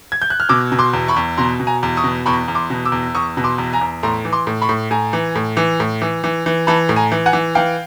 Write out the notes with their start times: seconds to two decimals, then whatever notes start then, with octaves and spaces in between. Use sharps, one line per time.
0.12 G#6
0.22 G6
0.30 F#6
0.40 F6
0.49 B2 D6 E6
0.72 B2
0.79 C6 D6
0.93 E2
1.08 B5 C#6
1.16 E2
1.37 B2 A#5 C6
1.60 B2
1.67 G#5 A#5
1.83 E2
1.97 C#6 D#6
2.04 B2
2.26 E2 B5 C#6
2.48 E2
2.55 C6 D6
2.70 B2
2.85 D6 E6
2.92 E2
3.15 E2 C#6 D#6
3.37 B2
3.44 C6 D6
3.58 E2
3.73 G#5 A#5
3.81 E2
4.03 A2 A#5 C6
4.25 E3
4.32 C6 D6
4.47 A2
4.62 B5 C#6
4.69 A2
4.91 A2 G#5 A#5
5.13 E3
5.35 A2
5.57 E3
5.80 A2
6.02 E3
6.24 E3
6.46 E3
6.67 E3 A5 B5
6.89 A2
6.96 G#5 A#5
7.12 E3
7.26 F#5 G#5
7.33 E3
7.55 E3 F5 G5